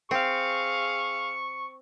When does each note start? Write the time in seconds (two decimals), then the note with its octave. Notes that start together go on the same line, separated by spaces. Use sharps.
0.11 C4 G#4 F5 C#6